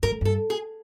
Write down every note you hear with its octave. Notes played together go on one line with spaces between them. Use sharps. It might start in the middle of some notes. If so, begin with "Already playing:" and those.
G2 A#4
G#2
G2 A4
G#4